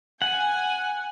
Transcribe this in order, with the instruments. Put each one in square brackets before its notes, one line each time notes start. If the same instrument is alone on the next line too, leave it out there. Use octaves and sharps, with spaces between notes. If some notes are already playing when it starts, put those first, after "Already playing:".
[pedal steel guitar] F#5 [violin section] G#5